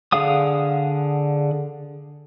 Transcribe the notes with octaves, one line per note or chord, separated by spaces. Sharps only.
D3 G#4 F5 F#5 D#6